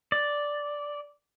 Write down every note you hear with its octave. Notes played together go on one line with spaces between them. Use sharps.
D5